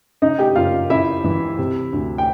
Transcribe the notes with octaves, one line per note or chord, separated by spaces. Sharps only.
C#3 D#4 D#5
G4 G5
F#1 F4 F5
C#3 E4 E5
E3
C3
D2
G5